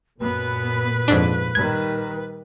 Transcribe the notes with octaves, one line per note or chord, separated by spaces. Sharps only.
F#2 A#2 B3 B4
F2 G#2 D4
D#3 G3 G#6